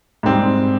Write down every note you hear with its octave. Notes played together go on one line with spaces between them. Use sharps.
G#2 G3 C4